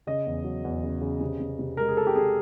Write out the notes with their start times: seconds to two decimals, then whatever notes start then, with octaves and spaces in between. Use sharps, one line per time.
0.07 C#3 D#5
0.26 E2
0.44 F#3
0.64 E2
0.83 C#3
1.01 C#3
1.21 C3
1.40 C3
1.59 C3
1.77 G#3 A#4
1.88 G#4
1.97 G#3 A4
2.07 G4
2.15 C3 G#4